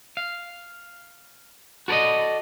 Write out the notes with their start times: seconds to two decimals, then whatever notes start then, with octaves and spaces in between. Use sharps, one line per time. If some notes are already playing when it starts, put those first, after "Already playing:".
0.17 F5
1.88 F#4 A4 A#4 D5 D#5